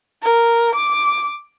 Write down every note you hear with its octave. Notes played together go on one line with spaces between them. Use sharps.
A#4
D6